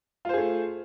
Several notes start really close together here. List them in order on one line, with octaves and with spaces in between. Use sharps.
F4 C5 G#4 A3